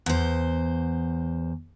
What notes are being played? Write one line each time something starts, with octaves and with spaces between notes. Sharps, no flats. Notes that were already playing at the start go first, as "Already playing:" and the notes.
E2 C5